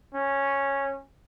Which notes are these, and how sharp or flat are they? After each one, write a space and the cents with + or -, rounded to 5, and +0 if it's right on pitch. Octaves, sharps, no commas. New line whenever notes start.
C#4 -5